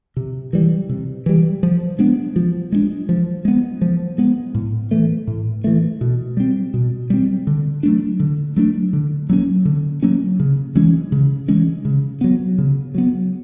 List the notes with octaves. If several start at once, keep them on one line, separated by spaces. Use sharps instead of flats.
C3
E3 G3
C3
E3 G3
F3
G#3 B3 D4
F3
G#3 B3 D4
F3
G#3 B3
F3
G#3 B3
A2
E3 A3
A2
E3 A3
B2
G3 C4
B2
G3 C4
D3
F#3 A3 D4
D3
F#3 A3 D4
D3
F#3 A#3 C#4
D3
F#3 A#3 C#4
C#3
E3 G#3 C#4
C#3
E3 G#3 C#4
C#3
F#3 B3
C#3
F#3 B3